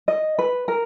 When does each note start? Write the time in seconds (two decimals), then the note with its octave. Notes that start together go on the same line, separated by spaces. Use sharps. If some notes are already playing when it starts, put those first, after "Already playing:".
0.08 D#5
0.39 B4
0.68 A#4